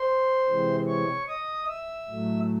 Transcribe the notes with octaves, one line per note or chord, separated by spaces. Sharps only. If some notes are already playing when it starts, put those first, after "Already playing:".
Already playing: C5 C6
C3 E3 G#3 C4
C#5 C#6
D#5 D#6
E5 E6
A2 F#3 A3